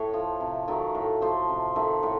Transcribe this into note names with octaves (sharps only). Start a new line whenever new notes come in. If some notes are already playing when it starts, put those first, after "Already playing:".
Already playing: A2 C#5
F3 A3
C3
D#3 F#3 A3
A2
F3 A3 C5
C3
D#3 A3
A2